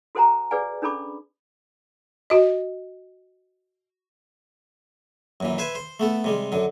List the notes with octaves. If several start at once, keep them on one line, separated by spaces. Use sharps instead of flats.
F#4 A4 C5 F#5 G#5 A#5
G#4 B4 D5 F#5 G#5
C#4 D4 G#4 A4 B5 D6
F#4 D#5
F#2 A#2 E3
B4 C5 E5 G#5
C5
A3 B3 A4
C3 G3 G#3
F#2 D3